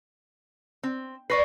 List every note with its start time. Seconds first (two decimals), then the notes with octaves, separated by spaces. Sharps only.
0.83 C4
1.30 B4 C5 D5 C#6 A#6 C7